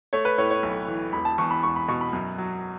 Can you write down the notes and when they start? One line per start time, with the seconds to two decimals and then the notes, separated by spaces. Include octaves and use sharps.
0.13 A3 C#5
0.25 B4
0.38 A2 C#5
0.50 C#5
0.63 B1
0.88 E3
1.13 E1 B5
1.25 A5
1.38 E2 C#6
1.51 B5
1.63 E1 C#6
1.76 B5
1.88 B2 C#6
2.01 B5
2.13 F#2
2.38 F#3